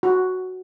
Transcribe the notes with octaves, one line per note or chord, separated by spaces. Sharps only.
F#4